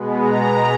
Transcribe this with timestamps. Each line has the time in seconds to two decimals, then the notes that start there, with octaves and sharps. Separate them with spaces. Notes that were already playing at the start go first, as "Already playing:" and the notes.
Already playing: B2 G#3 B3
0.21 A#5